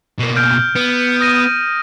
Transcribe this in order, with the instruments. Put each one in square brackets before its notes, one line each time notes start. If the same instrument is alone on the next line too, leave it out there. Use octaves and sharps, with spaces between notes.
[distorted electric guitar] B2 A#3
[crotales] F6 G6 D7
[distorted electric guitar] B3 [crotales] D7
[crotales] D#6 A#6 D#7